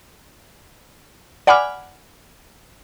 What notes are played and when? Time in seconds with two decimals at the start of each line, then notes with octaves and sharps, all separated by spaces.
1.47 D5 F#5 G#5 B5 D6 F6